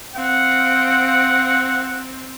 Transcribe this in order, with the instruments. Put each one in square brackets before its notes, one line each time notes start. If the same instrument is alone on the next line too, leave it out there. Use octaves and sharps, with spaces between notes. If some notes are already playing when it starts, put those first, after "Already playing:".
[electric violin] C4 [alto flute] F5 [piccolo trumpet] F#5